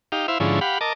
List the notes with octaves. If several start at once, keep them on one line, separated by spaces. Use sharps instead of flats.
D#4 G4 F5
E4 C5 E5 F5
G#2 D3 F3 C#4 E4
G4 F5 F#5 B5
A#4 D#5 A5 D6